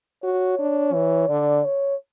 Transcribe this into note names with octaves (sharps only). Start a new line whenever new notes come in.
F#4 C#5
D4
E3
D3 D5
C#5